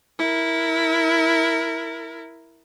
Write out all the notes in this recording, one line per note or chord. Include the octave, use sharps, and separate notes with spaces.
E4 A#4